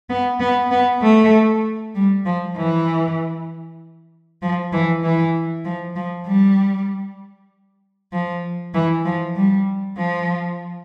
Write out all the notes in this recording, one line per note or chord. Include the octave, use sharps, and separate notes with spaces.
B3
B3
B3
A3
G3
F3
E3
F3
E3
E3
F3
F3
G3
F3
E3
F3
G3
F3